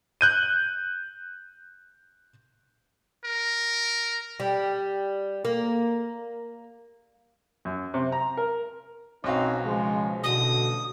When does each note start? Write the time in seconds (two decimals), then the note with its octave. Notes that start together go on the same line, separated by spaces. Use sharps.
0.21 F#6 G6 D#7
3.25 A#4
4.40 G3
5.45 A#3
7.65 F#2
7.94 C3
8.12 A#5
8.37 A#4
9.24 B1 C4 C#4 D#4 F#4 F5
9.64 C#3 F3 G#3
10.23 A1 B2 D3 D#6